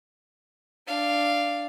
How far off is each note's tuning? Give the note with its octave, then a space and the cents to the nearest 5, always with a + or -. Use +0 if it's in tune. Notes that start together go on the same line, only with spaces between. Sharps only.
D4 +0 F5 -10